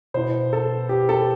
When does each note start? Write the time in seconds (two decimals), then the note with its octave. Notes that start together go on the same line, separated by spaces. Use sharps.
0.14 B2 B3 E4 C5
0.53 A4
0.89 G4
1.09 A4